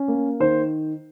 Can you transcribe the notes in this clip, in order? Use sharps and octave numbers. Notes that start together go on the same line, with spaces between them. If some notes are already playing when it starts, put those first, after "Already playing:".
Already playing: C#4
A#3
D#3 C5